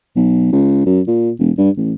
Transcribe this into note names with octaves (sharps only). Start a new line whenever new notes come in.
B1
C#2
F#2
A#2
E1
G2
A1